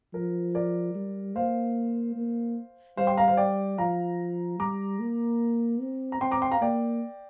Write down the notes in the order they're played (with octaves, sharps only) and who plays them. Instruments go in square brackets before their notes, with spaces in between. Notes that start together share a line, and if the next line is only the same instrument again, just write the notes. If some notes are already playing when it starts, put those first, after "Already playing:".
[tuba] F3 [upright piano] A#4
[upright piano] A#4 D5
[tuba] G3
[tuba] A#3 [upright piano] C5 F5
[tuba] A#3
[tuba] G3 [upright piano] C5 F5
[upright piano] G5 C6
F5 A#5
C5 F5
D5 G5
[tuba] F3 [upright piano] F5 A#5
[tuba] G3 [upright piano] A#5 D6
[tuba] A#3
C4
[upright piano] A#5
[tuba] C4 [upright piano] G5 C6
[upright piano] A#5 D6
G5 C6
F5 A#5
[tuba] A#3 [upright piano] D5 G5